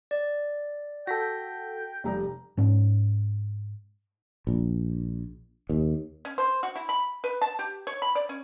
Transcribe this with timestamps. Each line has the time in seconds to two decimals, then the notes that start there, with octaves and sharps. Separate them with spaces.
0.11 D5
1.07 F#4 A4 G5 A#6 B6
2.04 F1 G3 A#5
2.57 G#2 C#4
4.47 A#1
5.70 D#2
6.25 C#4
6.38 C5
6.63 F#4
6.76 E4
6.89 B5
7.24 B4
7.42 A5
7.59 G4
7.87 C#5
8.02 B5
8.15 D5
8.29 C#4